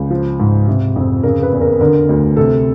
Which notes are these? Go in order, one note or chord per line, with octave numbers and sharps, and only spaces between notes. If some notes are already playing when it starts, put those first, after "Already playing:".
Already playing: C#2
F3
G#2
C3
F2
C#3 A#4
B4
E2
A#4
D3 A#4
D2
C3 A4